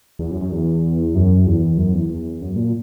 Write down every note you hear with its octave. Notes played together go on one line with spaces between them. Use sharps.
E2
F#2
F#2
E2
F#2
E2
F#2
E2
E2
F#2
A#2